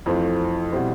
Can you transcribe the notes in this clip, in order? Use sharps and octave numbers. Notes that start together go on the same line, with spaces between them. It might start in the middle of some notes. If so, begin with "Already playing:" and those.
F2 E3 A3 C4 F4
B2 G3 C4 E4